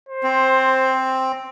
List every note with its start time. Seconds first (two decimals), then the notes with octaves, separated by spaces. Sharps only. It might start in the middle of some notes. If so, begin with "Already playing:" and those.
0.09 C5
0.23 C4